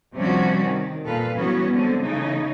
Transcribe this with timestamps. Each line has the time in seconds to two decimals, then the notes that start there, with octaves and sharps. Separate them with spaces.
0.15 C3 F3 G3 C#4 D4 F#4
0.63 D#3
1.05 A#2 A4 B4 F5
1.36 E3 F#3 G3 B3 C#4 F#4
1.74 D3 G#3 C4
2.04 C#3 E3 A3 D#4